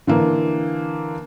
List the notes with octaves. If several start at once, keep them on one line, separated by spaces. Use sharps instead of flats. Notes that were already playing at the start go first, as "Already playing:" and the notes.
D3 E3 A#3